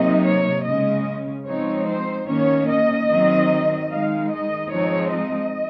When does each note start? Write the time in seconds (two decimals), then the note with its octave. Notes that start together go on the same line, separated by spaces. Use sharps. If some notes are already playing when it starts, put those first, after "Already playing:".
Already playing: C3 F#3 A#3 D#4 D#5
0.25 C#5
0.65 C#3 G#3 C#4 D#5
1.46 F3 G#3 C4 D#4 C#5
1.88 C5
2.28 D#3 A#3 C#4 C#5
2.68 D#5
3.09 D#3 F#3 C4 D#4
3.90 D#3 G#3 D#4 F5
4.31 D#5
4.71 F3 G#3 C4 D#4 C#5
5.12 D#5